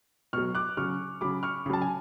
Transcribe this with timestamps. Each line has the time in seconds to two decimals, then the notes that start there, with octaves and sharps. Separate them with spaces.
0.33 B2 F#3 C#6 F6
0.55 D6 F#6
0.77 C#3 F#3 C#6 F6
1.21 C#3 F#3 B5 D6
1.43 C#6 F6
1.66 C#3 B5
1.70 F#3 A5
1.82 G#5